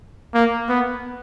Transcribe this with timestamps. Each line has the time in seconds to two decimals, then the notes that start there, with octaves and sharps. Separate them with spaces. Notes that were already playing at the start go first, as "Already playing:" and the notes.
0.34 A#3
0.69 B3